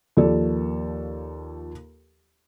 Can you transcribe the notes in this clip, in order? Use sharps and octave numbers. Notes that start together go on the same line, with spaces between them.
D#2 F3 A#3 A4 D5